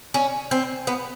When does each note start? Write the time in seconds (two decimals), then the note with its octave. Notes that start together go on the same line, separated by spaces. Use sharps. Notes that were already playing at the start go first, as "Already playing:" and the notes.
0.14 C#4
0.51 C4
0.87 B3